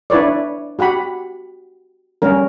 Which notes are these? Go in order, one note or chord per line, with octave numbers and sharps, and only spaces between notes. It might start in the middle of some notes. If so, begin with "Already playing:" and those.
D4 E4 B4 C#5 D5
F#4 G4 F#5 B5
G3 C#4 A#4